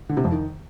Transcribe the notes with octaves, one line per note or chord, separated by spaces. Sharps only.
D3
C3
F2
D#3